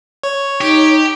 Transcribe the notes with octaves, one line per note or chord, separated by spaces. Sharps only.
C#5
D#4 G4